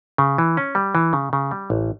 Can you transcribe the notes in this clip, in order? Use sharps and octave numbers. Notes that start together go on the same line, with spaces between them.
C#3
E3
C#4
G3
E3
C#3
C#3
G3
A1